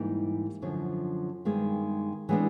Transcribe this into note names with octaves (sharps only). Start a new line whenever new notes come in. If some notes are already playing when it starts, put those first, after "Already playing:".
Already playing: G#2 E3 G3 A#3 D#4
F#2 D3 F3
G2 D#3 G#3 B3 D#4
E3 G#3 B3 D4